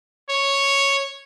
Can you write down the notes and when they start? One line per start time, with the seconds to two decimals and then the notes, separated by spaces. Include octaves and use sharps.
0.29 C#5